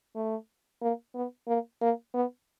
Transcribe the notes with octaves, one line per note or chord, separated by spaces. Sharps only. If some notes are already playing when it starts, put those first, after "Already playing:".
A3
A#3
B3
A#3
A#3
B3